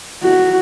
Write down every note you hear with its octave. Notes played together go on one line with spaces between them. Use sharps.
F#4